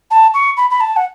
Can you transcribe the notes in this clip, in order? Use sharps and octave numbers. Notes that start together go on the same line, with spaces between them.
A5
C#6
B5
B5
A5
F#5